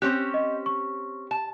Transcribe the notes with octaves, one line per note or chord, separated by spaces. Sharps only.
C4 C#4 G4 F#6
D#5
C#6
A5